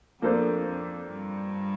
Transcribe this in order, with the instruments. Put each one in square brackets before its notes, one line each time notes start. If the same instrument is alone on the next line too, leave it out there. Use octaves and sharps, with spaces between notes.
[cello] F2 [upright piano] F3 A#3 D4 A4 C5
[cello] F2
G2